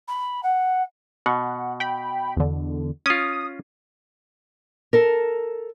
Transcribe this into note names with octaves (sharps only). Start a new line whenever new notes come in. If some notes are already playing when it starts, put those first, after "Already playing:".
B5
F#5
B2 F#5
G5 B5
E2 D3
C#4 F4 D#6
A4 A#4